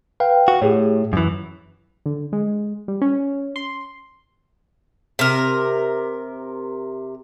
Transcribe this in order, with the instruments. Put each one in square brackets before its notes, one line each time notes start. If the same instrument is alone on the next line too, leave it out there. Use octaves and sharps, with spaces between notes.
[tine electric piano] B4 F5 G5
[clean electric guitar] F#4
[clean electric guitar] A2 [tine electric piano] G4 G#4 C#5
[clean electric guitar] F#2 E3
[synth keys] D3
G#3
G3
C#4
C6
[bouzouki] C3 A#4